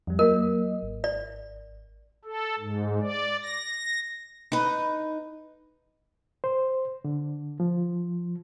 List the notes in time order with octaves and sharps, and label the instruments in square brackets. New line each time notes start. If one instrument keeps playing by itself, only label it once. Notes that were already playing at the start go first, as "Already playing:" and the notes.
[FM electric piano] F2 G3
[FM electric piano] F#3 A#3 D#5 [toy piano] A#4
[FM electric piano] G#1
[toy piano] D5
[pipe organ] A4
G#2
D5
A#6
[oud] D#4 B4
[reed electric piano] C5
D3
F3